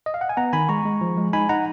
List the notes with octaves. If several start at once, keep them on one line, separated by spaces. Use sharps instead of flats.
D#5
F5
F#5
G#5
B3 F#5 A#5
D#3 G#5 B5
G#3 A#5 C#6
G#3
F3
G#3
D#4 G#5 B5
D#4 F#5 A#5